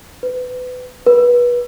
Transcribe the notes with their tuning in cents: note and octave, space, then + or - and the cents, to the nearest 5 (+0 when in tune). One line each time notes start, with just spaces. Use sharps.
B4 +25
B4 -25